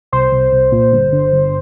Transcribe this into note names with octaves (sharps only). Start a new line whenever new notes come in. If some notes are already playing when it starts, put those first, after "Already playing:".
C2 C5
C2
C2
A#2
G1
D3
G1